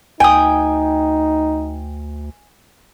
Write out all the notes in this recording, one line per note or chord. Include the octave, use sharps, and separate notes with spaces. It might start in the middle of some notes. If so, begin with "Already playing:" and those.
D2 D#4 G5 G#5 D#6